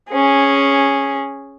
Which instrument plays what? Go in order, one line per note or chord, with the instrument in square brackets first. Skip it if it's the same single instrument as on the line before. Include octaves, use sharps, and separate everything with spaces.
[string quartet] C#4 G#4